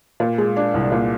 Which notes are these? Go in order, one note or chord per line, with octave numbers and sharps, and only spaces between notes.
A#2
G#3
D4
C2
A#2